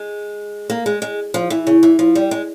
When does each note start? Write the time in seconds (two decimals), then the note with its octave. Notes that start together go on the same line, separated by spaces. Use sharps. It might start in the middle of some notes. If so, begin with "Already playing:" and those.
Already playing: G#3
0.70 A#3
0.86 G#3
1.02 G#3
1.34 F3
1.50 E3
1.67 C#3
1.83 E3
1.99 F3
2.15 G3
2.31 G#3